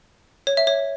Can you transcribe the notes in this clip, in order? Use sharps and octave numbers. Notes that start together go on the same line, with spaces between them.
C#5
E5
C#5